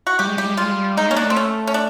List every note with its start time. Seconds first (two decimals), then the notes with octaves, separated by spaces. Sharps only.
0.07 F#4
0.19 G3 G4
0.27 G#3
0.37 G3 G4
0.46 G#3
0.54 G3 F4
0.64 G#3
0.72 G3
0.97 G#3 D#4
1.10 A#3 C#4
1.17 D4
1.24 A3
1.30 C4
1.36 C#4
1.67 C#4
1.74 D4